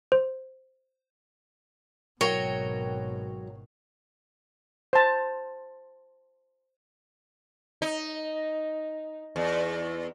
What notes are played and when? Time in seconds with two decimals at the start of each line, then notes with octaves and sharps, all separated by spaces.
0.12 C5
2.21 G#1 B2 F#3 A#4 C#5 G5
4.93 C5 A5
7.82 D#4
9.36 E2